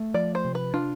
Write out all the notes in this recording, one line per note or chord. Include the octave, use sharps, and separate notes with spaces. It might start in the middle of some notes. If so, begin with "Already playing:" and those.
Already playing: A3
F3 D5
C5
C3
B4
D4 F4